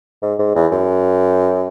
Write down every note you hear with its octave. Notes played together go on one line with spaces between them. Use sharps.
G#2
G#2
E2
F#2